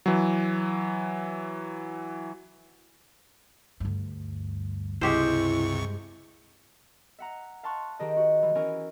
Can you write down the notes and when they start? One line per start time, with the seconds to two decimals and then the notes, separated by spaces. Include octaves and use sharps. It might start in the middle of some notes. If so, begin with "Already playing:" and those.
0.06 E3 F#3
3.80 D2 G2
5.01 C#2 G2 C3 G#3 E4 G4 C5 C#6
7.19 E5 F#5 A#5
7.63 F5 A5 C6 C#6 F#6
7.99 D#3 G4 G#4 D#5
8.16 F#4
8.43 E3
8.55 E3 C#4 E4 A#4 G#5